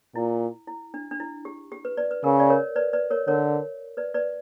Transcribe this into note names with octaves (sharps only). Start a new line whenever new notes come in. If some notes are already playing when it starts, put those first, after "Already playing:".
A#2 E4
E4
D4
D4
E4
G4
G4
B4
B4 D5
B4
C#3 A#4
D5
A#4 C#5
B4 D5
B4 D5
A#4 C#5
D3 A#4 C#5
B4 D5
B4 D5